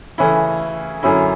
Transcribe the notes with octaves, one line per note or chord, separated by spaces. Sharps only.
C#3 E3 A3 C#4 E4
F#2 D3 F#3 C#4 E4